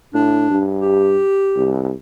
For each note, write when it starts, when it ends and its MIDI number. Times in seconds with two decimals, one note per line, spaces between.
0.14 0.48 45
0.14 0.63 62
0.51 1.20 43
0.82 1.74 67
1.57 1.94 36